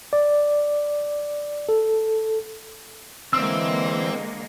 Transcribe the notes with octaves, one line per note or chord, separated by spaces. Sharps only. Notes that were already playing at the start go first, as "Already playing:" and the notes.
D5
A4
D3 E3 G#3 A#3 C4 E6